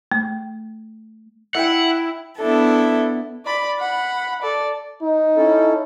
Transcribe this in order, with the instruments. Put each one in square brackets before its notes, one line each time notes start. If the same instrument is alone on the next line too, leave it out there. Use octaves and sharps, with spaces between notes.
[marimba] A3
[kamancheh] E4 [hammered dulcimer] E5 G5 [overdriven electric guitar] F#5
[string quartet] B3 D4 E4 A4
[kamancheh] D5 B5
F#5 B5
A4 D5
[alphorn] D#4
[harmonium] C#4 E4 A4